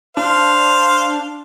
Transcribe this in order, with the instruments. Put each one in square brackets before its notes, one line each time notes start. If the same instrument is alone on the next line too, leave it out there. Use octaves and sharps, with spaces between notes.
[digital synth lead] D4 [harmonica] C5 F5